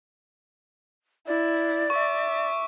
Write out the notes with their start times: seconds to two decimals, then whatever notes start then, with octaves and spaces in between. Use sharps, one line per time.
1.27 E4 D5
1.90 E5 C#6 D6